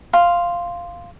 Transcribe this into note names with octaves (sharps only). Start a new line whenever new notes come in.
F5 C6